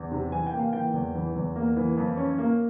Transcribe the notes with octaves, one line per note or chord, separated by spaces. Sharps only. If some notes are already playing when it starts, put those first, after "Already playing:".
Already playing: E2
C3
E3 G#5
G5
A#3
F5
E3 G5
E2
E3
E2
A#3
E3
F2
C#4
A#3